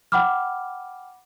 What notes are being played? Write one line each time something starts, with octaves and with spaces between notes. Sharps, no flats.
F#5 G5 B5 D6 F6